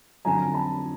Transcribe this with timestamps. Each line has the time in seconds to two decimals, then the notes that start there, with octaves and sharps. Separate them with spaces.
0.25 F2 D3 F#3 G#5 A#5
0.54 A5 B5